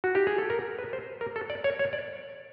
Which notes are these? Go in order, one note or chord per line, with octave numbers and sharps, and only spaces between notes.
F#4
G4
G#4
A4
A#4
B4
C5
A#4
A4
D5
C#5
C#5
D5